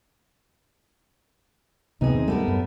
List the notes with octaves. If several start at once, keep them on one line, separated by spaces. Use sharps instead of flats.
C#2 C3 B3 D#4 G#4
D#2 C4
G3 A3 B3 A#4
F#2